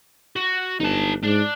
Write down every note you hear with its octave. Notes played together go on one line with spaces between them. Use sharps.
F#4
G1 D#4 A5
G#2 D4